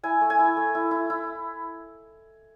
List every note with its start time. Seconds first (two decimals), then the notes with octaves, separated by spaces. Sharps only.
0.03 E4 G#5
0.21 A3
0.30 G#5
0.39 E4
0.57 A3
0.75 E4
0.91 E4
1.10 E4